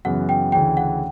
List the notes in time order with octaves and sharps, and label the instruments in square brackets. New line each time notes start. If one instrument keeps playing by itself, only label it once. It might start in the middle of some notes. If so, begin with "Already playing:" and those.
[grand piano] F#2 C#3 E3 B3 [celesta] F#5
[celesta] G5
[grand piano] D2 C#3 E3 [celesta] G5
[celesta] F#5